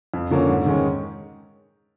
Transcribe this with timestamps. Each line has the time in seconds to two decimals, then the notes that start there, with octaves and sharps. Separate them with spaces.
0.14 F2
0.31 D3 F3 A#3 C#4
0.49 G#2
0.66 D#3 G#3 C#4